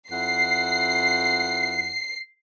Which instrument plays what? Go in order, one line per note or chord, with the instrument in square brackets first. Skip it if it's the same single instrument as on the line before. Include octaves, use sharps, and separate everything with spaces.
[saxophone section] F2 E4 F#5 [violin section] C7